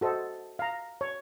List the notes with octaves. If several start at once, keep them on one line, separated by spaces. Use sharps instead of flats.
F#4 A4 C5 D#5
F5 A#5
C#5